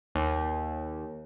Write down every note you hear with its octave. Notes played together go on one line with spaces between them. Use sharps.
D#2